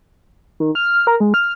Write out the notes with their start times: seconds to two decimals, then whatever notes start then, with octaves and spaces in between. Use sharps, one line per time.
0.60 D#3
0.75 F6
1.07 A#4
1.20 G#3
1.34 F6